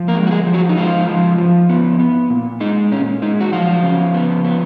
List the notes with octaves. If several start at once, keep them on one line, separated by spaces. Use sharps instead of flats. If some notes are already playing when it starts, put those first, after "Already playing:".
Already playing: F3
A#3 A#4
G#3
F#4
G#3 G#4
F3
F#3 F#4
D#4
G#2 F3 F4
F3
F3
B3
B3
A#2
G#3 D#4
A#2 C#4
G#3 D#4
F#4
F3 F#3 F4
C#3
B3
B3